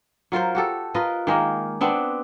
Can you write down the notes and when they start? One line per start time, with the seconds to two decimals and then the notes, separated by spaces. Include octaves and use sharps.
0.32 F#3 F4 A#4 C5
0.55 F#4 G4 A4
0.94 F4 A#4 B4 D#5
1.27 D#3 G#3 A#3
1.81 B3 C4 D4 B4